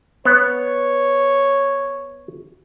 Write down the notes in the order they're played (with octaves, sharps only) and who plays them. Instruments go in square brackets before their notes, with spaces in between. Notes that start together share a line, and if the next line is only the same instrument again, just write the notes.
[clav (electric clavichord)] B3 [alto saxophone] C#5